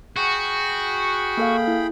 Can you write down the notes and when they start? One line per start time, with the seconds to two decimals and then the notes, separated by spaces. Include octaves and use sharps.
0.17 F#4 G#4 G5 B5
1.37 A#3 A4 F5
1.68 E4